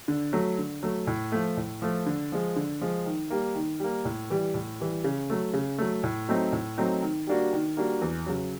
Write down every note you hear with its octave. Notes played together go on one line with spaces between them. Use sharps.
D3
F#3 A3
D3
F#3 A3
A2
F3 A3
A2
F3 A3
D3
F3 G#3
D3
F3 G#3
D#3
G3 A#3
D#3
G3 A#3
A2
E3 G3
A2
E3 G3
C#3
F#3 A3
C#3
F#3 A3
A2
F#3 A3 C4 D#4
A2
F#3 A3 C4 D#4
D#3
G3 A#3 D4 F#4
D#3
G3 A#3 D4 F#4
E2
C#3 F#3